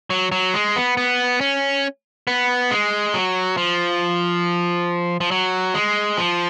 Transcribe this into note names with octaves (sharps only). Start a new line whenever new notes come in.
F#3
F#3
G#3
B3
B3
C#4
B3
G#3
F#3
F3
F3
F#3
G#3
F3